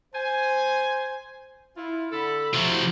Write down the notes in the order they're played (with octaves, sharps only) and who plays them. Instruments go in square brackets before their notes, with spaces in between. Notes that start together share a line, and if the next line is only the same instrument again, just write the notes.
[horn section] C5 G#5
E4 F4
D3 A4 B5
[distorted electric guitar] C3 F3 [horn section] E4 F#4